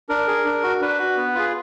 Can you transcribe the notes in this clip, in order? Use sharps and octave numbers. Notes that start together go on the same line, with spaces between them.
D4 A#4
G#4
D4
F#4
D4 B4
F#4
B3
F4 G#4